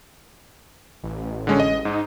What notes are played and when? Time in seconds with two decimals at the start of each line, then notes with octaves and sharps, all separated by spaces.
1.03 A1
1.47 D3 G#3 C#4
1.60 D#5
1.85 G#2 D#4